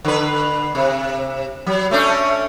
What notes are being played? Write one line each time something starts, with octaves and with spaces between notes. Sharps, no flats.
D3 B4
C3
F#3
A3 C#4 D4